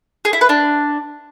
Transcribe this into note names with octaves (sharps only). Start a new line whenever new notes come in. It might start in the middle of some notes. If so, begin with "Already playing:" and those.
G#4
E4
B4
D4